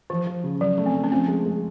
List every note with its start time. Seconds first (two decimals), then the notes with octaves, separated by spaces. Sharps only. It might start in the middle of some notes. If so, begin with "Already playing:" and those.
0.10 E3 F3
0.27 F3
0.44 C#3
0.61 C#3 F#3
0.78 A3
0.86 C4
0.95 A3
1.04 C#4
1.12 F3 C4
1.28 G#3
1.46 G#3